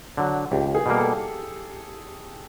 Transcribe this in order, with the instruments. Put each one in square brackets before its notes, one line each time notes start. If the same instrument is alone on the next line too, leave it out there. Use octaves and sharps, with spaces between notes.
[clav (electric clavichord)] D3 F#3
[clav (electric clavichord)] C#2 [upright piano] G4
[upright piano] G#4
[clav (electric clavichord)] B2 G3 A#3
[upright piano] A4